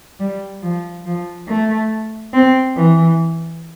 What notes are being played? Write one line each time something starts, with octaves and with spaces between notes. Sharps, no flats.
G3
F3
F3
A3
C4
E3